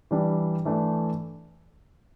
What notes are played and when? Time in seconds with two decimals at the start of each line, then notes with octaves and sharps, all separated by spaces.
0.11 E3 G3 D4
0.65 E3 A3 D4